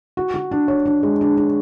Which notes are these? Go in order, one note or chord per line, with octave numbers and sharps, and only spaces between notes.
F#4
F#4
D4
C#5
D4
G#3
D4
D4